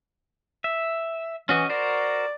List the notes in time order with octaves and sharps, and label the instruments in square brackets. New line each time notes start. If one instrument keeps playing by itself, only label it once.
[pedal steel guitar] E5
[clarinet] E3 [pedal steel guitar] C#4 F#4 D#5
[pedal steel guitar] F#4 A#4 C5 [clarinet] D5